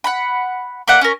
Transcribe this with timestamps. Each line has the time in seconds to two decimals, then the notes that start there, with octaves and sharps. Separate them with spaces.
0.04 F#5 B5
0.87 A#3 E4 D5 F#5
1.01 C#4 A#4